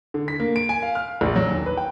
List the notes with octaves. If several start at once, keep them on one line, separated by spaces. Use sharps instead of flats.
D3
B6
A#3
D7
G#5
F5
F6
A#1
F#3
D#2
B4
G5